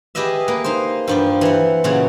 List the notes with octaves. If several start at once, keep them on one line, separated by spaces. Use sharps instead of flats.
G4 G#4 B4 D#5 E5
A#3 B4
D#4 C5
G2 F3 G4
E3 F#5
A#2 C#3 E3 F#3 C#5 F#5